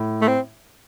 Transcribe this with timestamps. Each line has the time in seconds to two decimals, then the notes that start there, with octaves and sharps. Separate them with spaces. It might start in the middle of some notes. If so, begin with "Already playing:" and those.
Already playing: A2
0.21 A3
0.28 C4